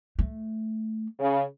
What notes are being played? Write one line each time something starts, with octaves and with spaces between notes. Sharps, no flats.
A3
C#3